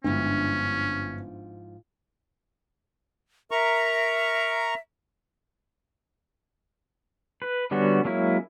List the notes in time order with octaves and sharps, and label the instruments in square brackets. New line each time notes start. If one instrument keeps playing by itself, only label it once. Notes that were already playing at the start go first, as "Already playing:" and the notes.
[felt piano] G1 [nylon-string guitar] G#2 F3 E4 [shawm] C#4 [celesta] D4
[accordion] A#4 A#5 C#6 [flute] E5
[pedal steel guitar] B4
D3 G3 B3 C#4 F#4
F#3 G#3 A#3 C#4 E4